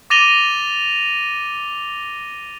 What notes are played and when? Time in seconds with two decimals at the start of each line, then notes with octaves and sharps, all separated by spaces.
0.10 D6 A6 A#6 D#7 F7 G7